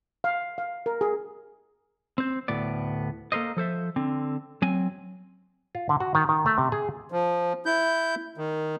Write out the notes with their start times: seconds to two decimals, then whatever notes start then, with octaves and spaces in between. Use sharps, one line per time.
0.24 F5
0.58 F5
0.86 A#4
1.01 G#4
2.18 C4 C5
2.48 D2 A2 B3 D5
3.32 A#3 A4 A#4 C5 D#5
3.57 F3 A4 C5 E5
3.96 D3 C4
4.62 F#3 C4 G#5
5.75 F4
5.89 D3
6.00 F#4
6.15 D#3
6.29 D#3
6.46 A3
6.58 C3
6.72 G#4
7.12 F3
7.66 E4 G6
8.38 D#3